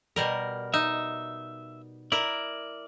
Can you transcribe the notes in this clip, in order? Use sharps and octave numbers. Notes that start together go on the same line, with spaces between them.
B2 G3 A#4
D#4 E5
E4 A#4 D5